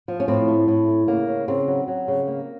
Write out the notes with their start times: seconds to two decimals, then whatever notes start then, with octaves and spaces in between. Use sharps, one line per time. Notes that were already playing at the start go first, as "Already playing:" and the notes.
0.08 F3
0.20 C#4
0.28 A2 C4
0.48 A3
0.68 A2
0.88 A3
1.08 C#3 A#3
1.28 C#3
1.48 C#3 C4
1.68 F#3
1.88 F#3
2.08 C#3
2.27 A#3